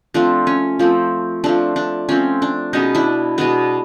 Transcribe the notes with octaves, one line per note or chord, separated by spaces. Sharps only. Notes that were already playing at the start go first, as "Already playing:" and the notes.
F3 A3 C4 D4
C#4
F3 A3 C4
F3 A3 C4 D4
D4
F3 A3 C4 C#4
D4
B2 G#3 B3 C#4 D#4
D4 E4
B2 G#3 B3 D4